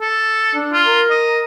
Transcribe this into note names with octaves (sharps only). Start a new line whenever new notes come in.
A4
D4
F4
A#4
D#5